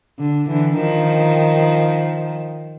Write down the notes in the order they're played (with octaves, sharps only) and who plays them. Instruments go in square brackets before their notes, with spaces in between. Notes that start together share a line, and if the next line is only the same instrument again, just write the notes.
[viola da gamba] D3
D3 E3
D#3 F3